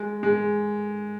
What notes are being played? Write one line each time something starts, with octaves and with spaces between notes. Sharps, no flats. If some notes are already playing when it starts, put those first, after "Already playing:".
Already playing: G#3
G#3